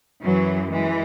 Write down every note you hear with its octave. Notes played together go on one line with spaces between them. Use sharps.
F#2 E3 F#3
E3 G#3